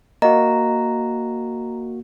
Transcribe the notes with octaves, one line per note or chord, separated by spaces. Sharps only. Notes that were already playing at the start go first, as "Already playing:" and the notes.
A#3 F#4 D#5 A#5